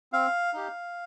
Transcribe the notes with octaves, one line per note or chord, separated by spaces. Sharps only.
C4 F5
D#4 G4